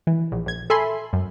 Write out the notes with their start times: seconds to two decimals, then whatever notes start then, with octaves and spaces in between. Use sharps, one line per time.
0.07 E3
0.32 A#1
0.46 A#1 G#6
0.70 A4 E5 G#5 B5 C6
1.13 F#2